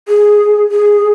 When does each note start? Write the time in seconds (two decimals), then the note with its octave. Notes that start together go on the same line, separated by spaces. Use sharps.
0.08 G#4
0.71 G#4